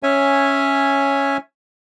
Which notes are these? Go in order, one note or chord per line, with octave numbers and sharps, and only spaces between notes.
C#4 C#5 E5 G#5